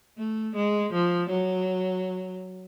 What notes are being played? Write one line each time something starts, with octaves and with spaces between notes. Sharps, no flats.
A3
G#3
F3
F#3